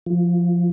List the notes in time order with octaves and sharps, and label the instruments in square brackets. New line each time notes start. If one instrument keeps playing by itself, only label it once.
[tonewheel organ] F3